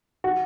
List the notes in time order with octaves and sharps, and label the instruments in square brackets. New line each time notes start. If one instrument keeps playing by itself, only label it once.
[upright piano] F#4